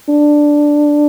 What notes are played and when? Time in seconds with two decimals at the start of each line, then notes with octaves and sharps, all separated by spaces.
0.09 D4